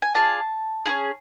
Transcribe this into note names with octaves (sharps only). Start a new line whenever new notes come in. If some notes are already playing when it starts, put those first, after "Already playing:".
G#5
D4 F4 G#4 A5
C#4 E4 G#4